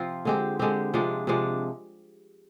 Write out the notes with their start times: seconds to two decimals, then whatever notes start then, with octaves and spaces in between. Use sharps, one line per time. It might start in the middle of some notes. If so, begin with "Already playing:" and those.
Already playing: C3 F3 C4 F4
0.25 D3 G#3 C4 G4
0.59 D3 G#3 C4 G4
0.94 C3 F3 G#3 D4
1.27 C3 F3 G#3 D4